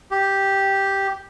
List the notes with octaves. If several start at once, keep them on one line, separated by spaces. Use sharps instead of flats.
G4